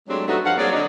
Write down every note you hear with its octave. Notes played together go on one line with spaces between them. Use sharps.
F#3 G#3 A3 C4 D4 G4
G2 F#3 A3 D#4 F#4
G2 F3 F5 F#5
F#3 A#3 C4 G#4 C#5 D5
D3 F#3 D4 D#4